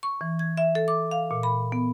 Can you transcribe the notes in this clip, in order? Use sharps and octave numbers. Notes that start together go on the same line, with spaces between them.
C#6
E3
G#6
E5
A4
D6
F5
A#2
B5
B3